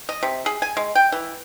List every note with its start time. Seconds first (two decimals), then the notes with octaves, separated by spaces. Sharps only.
0.09 D#5
0.23 C3
0.46 G#4
0.62 G#5
0.77 G#3
0.95 G5
1.12 E3